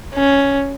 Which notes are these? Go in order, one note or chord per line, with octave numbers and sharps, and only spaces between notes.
C#4